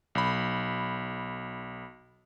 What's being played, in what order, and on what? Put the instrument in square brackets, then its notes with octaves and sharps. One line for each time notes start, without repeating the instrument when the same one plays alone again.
[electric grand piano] B1 B5